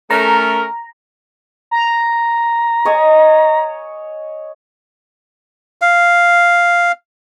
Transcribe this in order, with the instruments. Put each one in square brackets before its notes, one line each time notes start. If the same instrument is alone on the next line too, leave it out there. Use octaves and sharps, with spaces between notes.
[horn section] A3 C#4 A#4 [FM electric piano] A#5
[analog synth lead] A#5
[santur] C#5 D#5 G#5
[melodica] F5